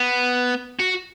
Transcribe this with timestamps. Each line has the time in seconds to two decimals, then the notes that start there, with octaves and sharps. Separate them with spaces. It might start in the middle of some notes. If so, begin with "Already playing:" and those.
Already playing: B3
0.79 F#4